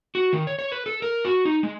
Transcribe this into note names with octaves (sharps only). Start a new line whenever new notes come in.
F#4
D#3
C#5
C#5
B4
A4
A#4
F#4
D#4
G#3